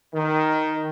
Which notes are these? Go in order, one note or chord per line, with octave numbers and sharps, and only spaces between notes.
D#3